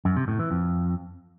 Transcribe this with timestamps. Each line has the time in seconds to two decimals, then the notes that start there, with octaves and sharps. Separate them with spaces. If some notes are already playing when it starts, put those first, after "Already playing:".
0.05 F#2
0.17 C3
0.28 A2
0.39 E3
0.51 F2